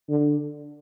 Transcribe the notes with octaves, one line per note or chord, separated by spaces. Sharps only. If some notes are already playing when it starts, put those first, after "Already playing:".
D3